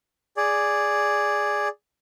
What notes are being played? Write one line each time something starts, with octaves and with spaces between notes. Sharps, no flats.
G#4 D5